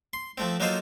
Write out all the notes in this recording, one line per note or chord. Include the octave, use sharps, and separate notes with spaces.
C6
F3 A3 C4
F#3 A#3 D#4 F4 A4 C5